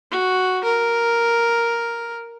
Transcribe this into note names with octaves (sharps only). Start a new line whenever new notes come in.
F#4
A#4